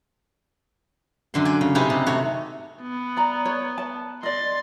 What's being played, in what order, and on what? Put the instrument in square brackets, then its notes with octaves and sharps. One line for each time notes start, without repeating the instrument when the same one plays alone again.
[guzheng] F#2 D3 C6
D5 G#5
C#3
C3 D#4 G4 G#4 B4
C3
A3 F#4 C#5
[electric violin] B3
[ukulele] D5 A#5
C#5
A5
[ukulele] D5 D#5 [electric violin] C6 A6